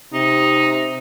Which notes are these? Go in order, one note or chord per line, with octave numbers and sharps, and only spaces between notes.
C3 D#4